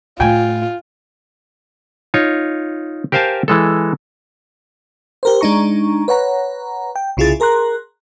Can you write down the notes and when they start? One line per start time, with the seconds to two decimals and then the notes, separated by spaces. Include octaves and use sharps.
0.20 A2 A3 F4 G5 G#5
2.14 D#4 F4 C#5
3.12 G4 A#4 C5 F5 G#5 A5
3.48 E3 G#3 A4
5.23 G4 A#4 C5
5.41 G#3 D4 D#4 A#5 C#6
6.08 B4 C#5 F#5 A#5
6.96 G5
7.17 C2 C#3 E4 F4 G#4 A6
7.40 G#4 A#4 A#5 C6 F#6